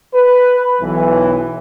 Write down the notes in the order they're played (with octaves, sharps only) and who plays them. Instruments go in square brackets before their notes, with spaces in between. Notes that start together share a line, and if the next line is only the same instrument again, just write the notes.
[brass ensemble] B4
B1 E3